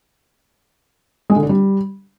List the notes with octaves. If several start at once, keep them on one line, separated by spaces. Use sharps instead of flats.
G#3
D3
D4
G3